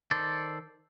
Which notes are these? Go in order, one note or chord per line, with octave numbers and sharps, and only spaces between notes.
D#3 A4 C5 D5